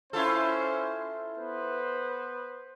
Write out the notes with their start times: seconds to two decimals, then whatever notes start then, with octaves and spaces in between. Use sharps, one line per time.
0.13 C#4 E4 F4 A4 C5
1.38 B3 B4 C5